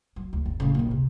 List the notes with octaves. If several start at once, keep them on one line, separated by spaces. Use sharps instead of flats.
F#3
D2
G1
A2 C#3
A#1 D#3
C3